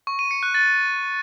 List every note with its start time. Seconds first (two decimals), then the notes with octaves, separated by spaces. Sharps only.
0.07 C#6
0.19 D#7
0.31 C#7
0.43 F#6
0.54 A6